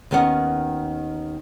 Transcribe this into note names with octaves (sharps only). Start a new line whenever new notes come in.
D#2 D#3 B3 C#4 F#5